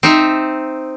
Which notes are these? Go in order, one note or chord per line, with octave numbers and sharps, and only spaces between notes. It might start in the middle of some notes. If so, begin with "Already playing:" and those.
C4 D#4 E5